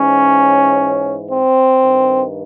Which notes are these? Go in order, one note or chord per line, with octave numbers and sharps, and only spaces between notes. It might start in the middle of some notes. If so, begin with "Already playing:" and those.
Already playing: G#2 E3 C#4
C4
G2 D#3